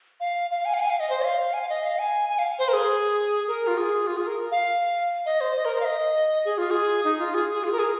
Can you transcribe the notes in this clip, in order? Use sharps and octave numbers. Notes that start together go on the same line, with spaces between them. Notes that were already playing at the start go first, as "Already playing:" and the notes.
F5
F5
G#5
F5
G#5
F5
D#5
C5
F5
G#5
F5
D#5
F5
G#5
G#5
F5
C5
A#4
G#4
A#4
F4
G#4
F4
G#4
A#4
F5
D#5
C5
D#5
A#4
C5
F5
D#5
G#4
F4
G#4
D#4
F4
G#4
G#4
F4
A#4
G#4